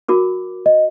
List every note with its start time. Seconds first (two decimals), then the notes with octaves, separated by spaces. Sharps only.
0.08 F#4 A#4 D6
0.66 D#5